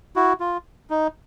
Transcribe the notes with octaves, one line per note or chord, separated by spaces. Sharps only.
E4 F#4
F4
D#4